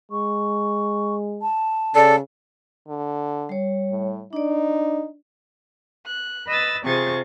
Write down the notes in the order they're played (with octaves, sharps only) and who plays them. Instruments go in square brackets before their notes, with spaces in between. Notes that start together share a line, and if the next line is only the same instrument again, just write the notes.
[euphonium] G#3 [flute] C#6
[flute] A5
[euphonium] C#3 [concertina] A4 [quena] D5
[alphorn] D3
[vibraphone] G3 C#5
[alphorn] A2
[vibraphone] D4 D5 [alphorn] D#4
[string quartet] F#6
B4 D#5 B5 E6 A6
C3 F4 G#4 C5 C#6 A6